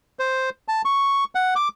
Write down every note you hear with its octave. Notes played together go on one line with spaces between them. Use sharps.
C5
A5
C#6
F#5
D6